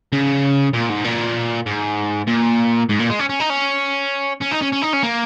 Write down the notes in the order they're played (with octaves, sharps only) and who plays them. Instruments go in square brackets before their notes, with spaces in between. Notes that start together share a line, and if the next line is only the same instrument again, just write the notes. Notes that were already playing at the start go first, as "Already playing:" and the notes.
[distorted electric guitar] C#3
A#2
G#2
A#2
G#2
A#2
G#2
A#2
G#3
C#4
C#4
D#4
C#4
C#4
D#4
C#4
C#4
D#4
C#4
A#3